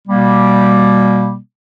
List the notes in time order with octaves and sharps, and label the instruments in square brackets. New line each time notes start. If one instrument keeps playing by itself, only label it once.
[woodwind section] B2 G3 A#3